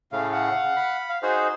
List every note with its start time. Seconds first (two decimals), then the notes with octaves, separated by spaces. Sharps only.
0.12 A2 C#3 A3 F5
0.33 F5 F#5
0.64 C#3
0.76 B5
1.09 F5
1.23 D#4 F#4 G#4 C5